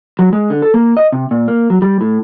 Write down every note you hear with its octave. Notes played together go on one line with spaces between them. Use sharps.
F#3
G#3
D3
A4
A#3
D#5
C3
A#2
A#3
F#3
G3
A2